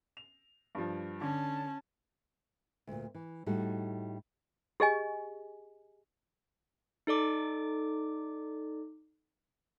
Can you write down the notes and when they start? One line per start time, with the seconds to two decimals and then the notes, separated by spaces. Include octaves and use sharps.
0.17 F7
0.75 G2 F3
1.21 D3 C#4 A5
2.87 D2 A#2
3.15 E3
3.46 A2 G3 D#4 F#4 A4
4.80 G4 G#4 D#5 G#5
7.07 D#4 A4 D5 D6